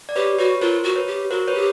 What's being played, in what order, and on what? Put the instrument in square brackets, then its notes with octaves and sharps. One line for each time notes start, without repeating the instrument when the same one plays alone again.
[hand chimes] D5
[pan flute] G4 [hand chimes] B4 C#5
[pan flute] F#4 [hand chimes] B4 C#5
[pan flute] F4 [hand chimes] A#4 C5
[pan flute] F#4
[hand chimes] B4 C#5
[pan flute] G4
[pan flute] F#4 [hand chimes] A#4 C5
[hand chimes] B4 C#5
[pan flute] G4